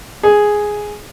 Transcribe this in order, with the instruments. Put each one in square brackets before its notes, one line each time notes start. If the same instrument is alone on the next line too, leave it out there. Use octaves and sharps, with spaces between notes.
[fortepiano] G#4